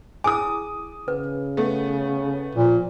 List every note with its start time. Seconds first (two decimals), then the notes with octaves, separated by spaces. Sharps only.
0.24 E4 G#4 G#5 D6 D#6
1.08 C#3 B4
1.57 A3 B3
2.56 A#2 F3